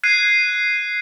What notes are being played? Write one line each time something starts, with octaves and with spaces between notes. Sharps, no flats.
F#6 G#6 C7 D#7